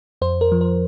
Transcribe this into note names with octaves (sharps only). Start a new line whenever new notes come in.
F2 C5
A#4
F3
A#4